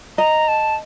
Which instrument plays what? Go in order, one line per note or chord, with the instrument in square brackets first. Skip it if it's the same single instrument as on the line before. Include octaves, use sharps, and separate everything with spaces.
[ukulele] D#5 [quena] A#5
[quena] A5